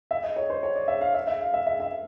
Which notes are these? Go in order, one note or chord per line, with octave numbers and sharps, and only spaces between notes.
E5
D#5
C#5
C5
C#5
D5
E5
F5
E5
E5
F5
E5
E5
E5